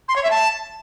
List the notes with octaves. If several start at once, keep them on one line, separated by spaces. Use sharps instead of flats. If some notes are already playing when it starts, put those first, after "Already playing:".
C6
C#5
E5
A5